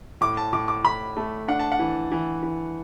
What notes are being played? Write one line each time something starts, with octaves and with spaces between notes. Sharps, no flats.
A2 D6
A5
A2 D6
D6
A2 B5
A3
D4 F#5
A5
F#5
E3
E3
E3